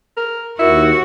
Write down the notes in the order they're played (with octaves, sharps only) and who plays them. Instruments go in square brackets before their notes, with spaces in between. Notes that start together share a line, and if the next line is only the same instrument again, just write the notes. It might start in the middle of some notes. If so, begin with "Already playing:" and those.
[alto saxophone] A#4
[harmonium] D#2 [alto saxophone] E4 [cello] F#4 [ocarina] A#4